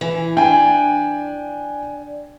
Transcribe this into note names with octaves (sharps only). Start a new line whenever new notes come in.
E3
D4 G5 G#5